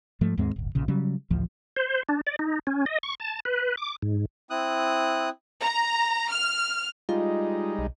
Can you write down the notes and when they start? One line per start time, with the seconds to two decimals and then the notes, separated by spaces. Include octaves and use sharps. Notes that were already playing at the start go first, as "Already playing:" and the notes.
0.21 G#2 F3 A3
0.37 D#2 G#2 G#3 C4
0.56 D1 G1
0.75 A#1 A#2 C#3
0.88 C#3 F#3 G3 C#4
1.30 A1 D2 F3
1.76 C5
2.09 D4
2.27 D5
2.39 D#4
2.67 C#4
2.86 D#5
3.03 C#6
3.20 A5
3.45 B4
3.77 D6
4.02 G#2
4.50 C4 E4 D#6 F#6
5.62 A#5
6.30 F6
7.09 G3 G#3 D#4 F4
7.79 B1